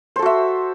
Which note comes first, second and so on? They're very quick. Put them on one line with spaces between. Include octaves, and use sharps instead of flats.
C5 A4 F#4 E5